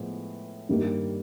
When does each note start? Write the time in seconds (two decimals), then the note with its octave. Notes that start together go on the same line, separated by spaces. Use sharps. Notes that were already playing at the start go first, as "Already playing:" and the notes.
Already playing: A2 F3 G#3 B3
0.69 G2 D#3 G3 A#3